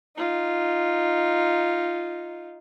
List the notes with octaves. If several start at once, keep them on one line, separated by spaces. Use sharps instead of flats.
D#4 F4